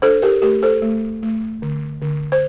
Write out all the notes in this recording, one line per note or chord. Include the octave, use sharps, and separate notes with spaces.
D4 A4 C5
G4 A#4
A3 G4 A#4
A4 C5
A3
A3
D3
D3
C5